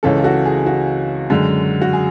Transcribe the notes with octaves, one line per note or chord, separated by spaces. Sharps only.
C#2 C#3 E3 G#3 A4 C#5
F#4 A4
G#4
F#4
F#2 D3 G#3
F#4
G#4